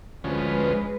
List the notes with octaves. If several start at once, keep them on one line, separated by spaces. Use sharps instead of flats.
D2 F3 G#3 C#4 B4